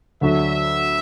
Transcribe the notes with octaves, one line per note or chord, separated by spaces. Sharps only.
D2 D3 F#3 D4 F#4 E5